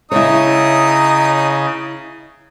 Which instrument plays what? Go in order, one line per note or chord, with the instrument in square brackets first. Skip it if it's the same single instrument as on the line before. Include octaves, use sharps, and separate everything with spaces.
[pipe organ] C#3 [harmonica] D#4 D#6 [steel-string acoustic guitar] E4 C#5 [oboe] A#5